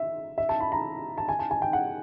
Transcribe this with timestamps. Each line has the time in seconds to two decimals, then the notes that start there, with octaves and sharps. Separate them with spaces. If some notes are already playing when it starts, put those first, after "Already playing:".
Already playing: E5
0.38 E5
0.49 A5
0.60 B5
0.72 A#5
1.18 A5
1.29 G#5
1.39 A5
1.51 G#5
1.62 G5
1.73 F#5